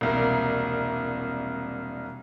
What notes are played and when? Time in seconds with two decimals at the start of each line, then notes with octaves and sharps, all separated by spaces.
0.01 E1 C2 A#3